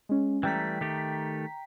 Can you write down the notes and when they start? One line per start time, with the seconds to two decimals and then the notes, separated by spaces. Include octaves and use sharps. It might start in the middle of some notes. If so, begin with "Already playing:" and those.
0.09 G#3 C#4
0.43 E3 G3 A3 G5 A#5 B6
0.81 D#3 A3 G4